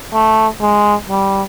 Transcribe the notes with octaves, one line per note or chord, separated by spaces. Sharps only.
A3
G#3
G3